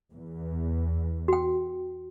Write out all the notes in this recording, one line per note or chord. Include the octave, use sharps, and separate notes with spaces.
E2
F#4 G5